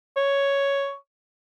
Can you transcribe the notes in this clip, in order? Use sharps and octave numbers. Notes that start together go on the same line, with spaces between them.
C#5